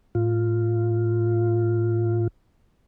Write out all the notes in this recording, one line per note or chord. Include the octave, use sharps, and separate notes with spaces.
A2 F4